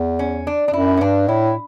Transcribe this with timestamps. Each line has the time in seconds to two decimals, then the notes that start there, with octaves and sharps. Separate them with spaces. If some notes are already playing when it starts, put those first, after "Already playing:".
Already playing: E2
0.19 C#4
0.47 D4
0.68 D4
0.73 F#2 E4
0.97 C#4
1.01 G2 D4
1.28 A2 E4